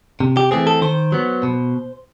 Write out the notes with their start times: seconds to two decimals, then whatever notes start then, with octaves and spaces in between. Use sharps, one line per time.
0.20 C3
0.37 G4
0.51 E3 A3 C4 G#4
0.67 A4
0.82 D#3 C5
1.12 F#3 B3
1.43 B2